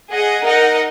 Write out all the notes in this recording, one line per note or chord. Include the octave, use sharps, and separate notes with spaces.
G#4 D#5 F#5
D#4 A#4 D#5 F#5